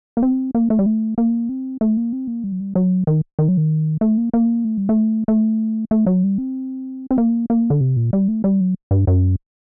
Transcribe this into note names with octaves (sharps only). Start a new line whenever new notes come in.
A#3
C4
A#3
A3
G3
A3
A#3
C4
A3
A#3
C4
A#3
G3
F#3
G3
F#3
D#3
D#3
F#3
D#3
A3
A#3
A#3
A3
G3
A3
A3
A3
F#3
G3
C4
C4
A#3
A#3
D3
C3
A#2
G3
A3
G3
F#3
G2
F#2